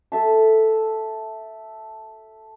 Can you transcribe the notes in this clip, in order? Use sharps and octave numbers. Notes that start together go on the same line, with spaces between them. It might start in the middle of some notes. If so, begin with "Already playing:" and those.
A4 E5 A5